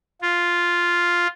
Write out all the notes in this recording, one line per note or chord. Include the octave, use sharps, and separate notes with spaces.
F4